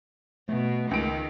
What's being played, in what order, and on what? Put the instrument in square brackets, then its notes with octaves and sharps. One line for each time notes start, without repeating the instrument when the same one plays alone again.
[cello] B2 [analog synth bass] A3
[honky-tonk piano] C#2 D7 [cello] D#3